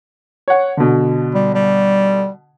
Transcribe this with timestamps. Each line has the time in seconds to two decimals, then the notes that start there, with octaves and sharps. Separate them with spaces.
0.48 C#5 F#5
0.77 B2 D3
1.34 G3
1.55 G3